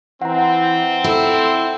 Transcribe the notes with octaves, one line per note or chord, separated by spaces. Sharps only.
E3 C4 F#5 A#5
E4 A4